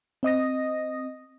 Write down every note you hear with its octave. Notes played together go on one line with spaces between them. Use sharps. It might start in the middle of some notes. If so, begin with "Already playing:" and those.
C4 D#5 D#6 A#6